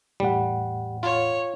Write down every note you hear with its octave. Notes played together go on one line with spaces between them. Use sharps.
E2 A2 G3 F#5
F4 C#5